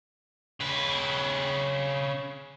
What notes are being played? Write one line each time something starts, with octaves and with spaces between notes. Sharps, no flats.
C#3 B4